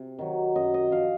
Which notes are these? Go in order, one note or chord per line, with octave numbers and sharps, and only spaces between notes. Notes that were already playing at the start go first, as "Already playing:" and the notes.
Already playing: C3
D#3 F#3
F#2 D#5
D#5
F3 F5